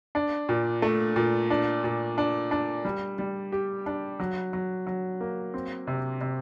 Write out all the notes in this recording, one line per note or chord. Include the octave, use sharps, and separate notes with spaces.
D4
A#2
A3
A#2
D4
A#2
D4
D4
G3
G3
G4
D4
F#3
F#3
F#3
A#3
C4
C3
C3